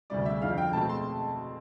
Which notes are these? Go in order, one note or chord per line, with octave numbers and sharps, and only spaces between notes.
D2 C3 G3 D5
E5
F2 D3 F3 C4 F5
G5
B2 A3 C4 A5
C6